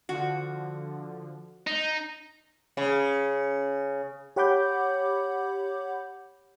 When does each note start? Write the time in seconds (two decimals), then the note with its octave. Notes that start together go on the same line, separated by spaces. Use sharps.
0.09 D3 F3 F#4
1.67 D#4
2.77 C#3
4.36 G4 C#5 F#5 B5 D6 G6